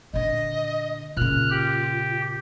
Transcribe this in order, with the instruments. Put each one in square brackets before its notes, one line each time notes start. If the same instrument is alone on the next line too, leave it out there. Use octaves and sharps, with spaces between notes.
[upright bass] A#2 D3 [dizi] D#5
[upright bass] A#2 C#3 [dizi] F4 [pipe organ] F6 F#6
[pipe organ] G4